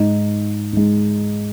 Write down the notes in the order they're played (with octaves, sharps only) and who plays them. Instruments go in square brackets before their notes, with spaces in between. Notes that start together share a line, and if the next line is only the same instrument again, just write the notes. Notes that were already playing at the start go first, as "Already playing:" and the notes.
Already playing: [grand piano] G#2 G#3 D#4
G#2 G#3